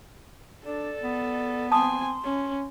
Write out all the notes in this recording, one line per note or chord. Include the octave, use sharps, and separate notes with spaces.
D4 A4 D5
B3
C4 G#5 A5 C6 D#6
C#4